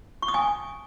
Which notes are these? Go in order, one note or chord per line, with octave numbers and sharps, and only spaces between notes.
C#6
D#6
G#5